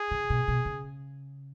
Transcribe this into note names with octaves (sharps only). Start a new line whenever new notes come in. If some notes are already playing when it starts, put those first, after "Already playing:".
Already playing: G#4
C#3
B2
B2
C#3